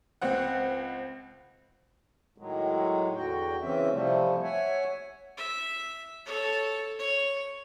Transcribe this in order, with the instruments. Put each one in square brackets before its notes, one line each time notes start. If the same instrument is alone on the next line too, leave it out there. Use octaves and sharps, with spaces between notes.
[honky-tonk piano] C#2 C4 F#5
[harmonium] A2 D#3 F#3 G#3
E2 D3 F#4 G5
C#3 E3 C4 C#4 E5
A2 C3 F3 G3 A3
C#5 E5 F#5 G#5
[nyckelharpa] E5
A4 C#5
C#5